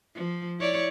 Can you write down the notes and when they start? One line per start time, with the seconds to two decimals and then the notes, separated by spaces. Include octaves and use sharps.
0.15 F3
0.59 E4 C#5 D5